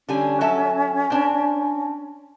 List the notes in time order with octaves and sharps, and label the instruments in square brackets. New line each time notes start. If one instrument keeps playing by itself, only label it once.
[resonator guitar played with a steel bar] D3 G3 G#5 [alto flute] C#4
[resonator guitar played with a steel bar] F#3 A4 E5
C4 D4